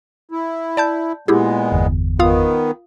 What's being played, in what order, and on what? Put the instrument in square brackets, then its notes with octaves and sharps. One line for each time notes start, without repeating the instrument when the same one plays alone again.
[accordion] E4
[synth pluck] D5 A5 G6
[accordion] A#2 G#3 B3 [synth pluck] E4 G4 G#4
[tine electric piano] G1 E2
[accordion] D#3 B3 [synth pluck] F4 F5 D#6